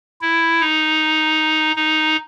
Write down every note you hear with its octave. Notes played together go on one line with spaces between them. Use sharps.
E4
D#4
D#4